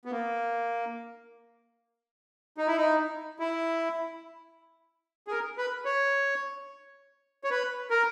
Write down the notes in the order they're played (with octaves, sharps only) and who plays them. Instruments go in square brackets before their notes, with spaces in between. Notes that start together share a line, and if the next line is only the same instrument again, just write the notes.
[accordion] B3
A#3
D#4
E4
D#4
E4
G#4
A#4
B4
C#5
C#5
B4
A#4